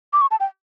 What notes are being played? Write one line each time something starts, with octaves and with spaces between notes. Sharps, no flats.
D6
C#6
A5
G5